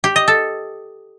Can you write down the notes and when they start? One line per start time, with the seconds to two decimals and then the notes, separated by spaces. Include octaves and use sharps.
0.04 G4
0.16 D#5
0.28 A4